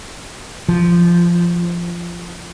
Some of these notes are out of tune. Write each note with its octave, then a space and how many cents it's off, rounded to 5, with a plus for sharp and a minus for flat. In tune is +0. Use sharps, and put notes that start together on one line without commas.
F3 -15